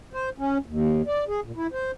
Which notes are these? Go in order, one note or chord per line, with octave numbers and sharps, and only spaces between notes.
C5
C#4
D#2
D5
G#4
A#2
E4
C5